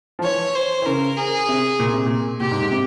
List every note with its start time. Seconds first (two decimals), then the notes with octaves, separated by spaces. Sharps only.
0.19 F3
0.24 E3 C#5
0.55 C5
0.82 E3
0.86 C#3 A#4
1.17 G#4
1.49 C3
1.80 A#2
1.93 C3
2.06 A#2
2.40 A#2 G4
2.51 G#2
2.61 G#2
2.71 C3